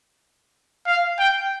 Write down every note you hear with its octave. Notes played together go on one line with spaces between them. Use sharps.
F5
G5